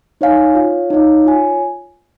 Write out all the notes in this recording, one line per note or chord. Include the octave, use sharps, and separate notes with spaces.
D#4 C#5 F5 G#5
F4 C#5 F5
D#4 C#5 F5
F4 C#5 G#5